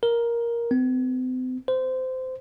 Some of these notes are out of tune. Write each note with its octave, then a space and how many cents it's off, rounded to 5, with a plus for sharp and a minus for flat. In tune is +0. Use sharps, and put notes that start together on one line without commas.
A#4 +10
C4 -45
C5 -20